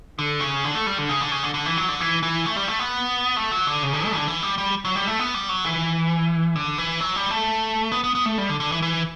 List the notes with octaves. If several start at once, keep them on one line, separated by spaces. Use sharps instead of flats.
D3
C#3
D3
A3
G3
D3
C#3
D3
C#3
D3
D3
E3
F#3
D3
E3
E3
A3
G3
A3
B3
A3
F#3
D3
C#3
D3
A3
D3
E3
G3
G3
F#3
G3
A3
B3
G3
F#3
E3
D3
E3
F#3
G3
A3
B3
B3
B3
A3
G3
D3
D3
E3
E3